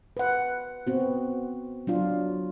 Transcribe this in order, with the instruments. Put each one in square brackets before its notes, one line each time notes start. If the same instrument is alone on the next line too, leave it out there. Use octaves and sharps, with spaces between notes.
[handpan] B4 F#5
B3 C4 F#4
F#3 D4 F4